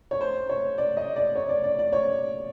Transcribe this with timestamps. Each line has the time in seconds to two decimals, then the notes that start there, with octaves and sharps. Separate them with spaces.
0.11 C#5
0.21 C5
0.49 C#5
0.78 D5
0.97 D#5
1.16 D5
1.36 C#5
1.49 D5
1.64 D5
1.79 D5
1.93 C#5